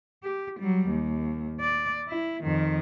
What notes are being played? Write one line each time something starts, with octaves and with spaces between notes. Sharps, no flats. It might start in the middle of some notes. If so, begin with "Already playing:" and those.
G4
F#3 G3
D#2
D5
E4
F2 D#3